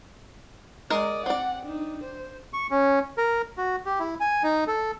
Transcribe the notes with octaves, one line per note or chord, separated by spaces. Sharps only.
G#3 A#4 D5 D#5 A#5
C4 D5 F#5
D4 D#4
C5
C#6
C#4
A#4
F#4
G4
E4
G#5
D#4
A4